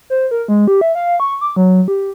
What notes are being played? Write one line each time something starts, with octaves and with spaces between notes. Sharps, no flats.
C5
A#4
G#3
G4
E5
F5
C#6
D6
F#3
G4